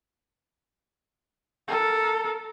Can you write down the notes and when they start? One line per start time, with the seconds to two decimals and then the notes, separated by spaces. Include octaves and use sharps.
1.68 A4 A#4